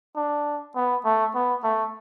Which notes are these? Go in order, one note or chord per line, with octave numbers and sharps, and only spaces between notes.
D4
B3
A3
B3
A3